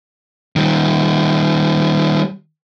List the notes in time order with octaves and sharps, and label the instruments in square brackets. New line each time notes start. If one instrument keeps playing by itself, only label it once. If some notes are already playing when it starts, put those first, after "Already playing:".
[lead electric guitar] D#3 G3